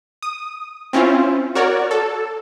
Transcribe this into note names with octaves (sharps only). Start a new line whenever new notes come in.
D#6
C4 C#4 E4 F4
F#4 A#4 C#5 D5
A4